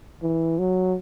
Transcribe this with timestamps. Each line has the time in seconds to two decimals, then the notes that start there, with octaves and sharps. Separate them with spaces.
0.22 E3
0.59 F#3